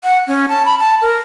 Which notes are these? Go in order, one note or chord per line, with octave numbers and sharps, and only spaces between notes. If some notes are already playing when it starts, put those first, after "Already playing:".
F#5
C#4
A5
B5
A5
A#4